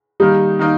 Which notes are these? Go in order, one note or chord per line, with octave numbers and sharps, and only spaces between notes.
D#3 G3 A#3 D#4
D#3 A#3 D#4